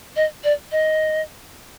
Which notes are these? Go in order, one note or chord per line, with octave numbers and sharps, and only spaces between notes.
D#5
D5
D#5